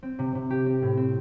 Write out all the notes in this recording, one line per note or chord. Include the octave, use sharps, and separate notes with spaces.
C4
C3
C3
G4
C4
A2
C4